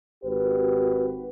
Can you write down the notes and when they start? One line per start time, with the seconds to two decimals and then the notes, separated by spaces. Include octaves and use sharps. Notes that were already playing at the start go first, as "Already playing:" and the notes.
0.24 G#1 F#4 G4 B4